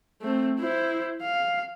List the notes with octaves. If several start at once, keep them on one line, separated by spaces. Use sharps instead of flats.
A3 C4
E4 C5
F5